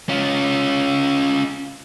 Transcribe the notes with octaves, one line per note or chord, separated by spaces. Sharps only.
C#4 F4